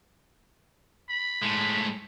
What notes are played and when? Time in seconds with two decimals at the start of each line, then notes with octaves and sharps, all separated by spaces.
1.10 B5
1.43 A2 G#3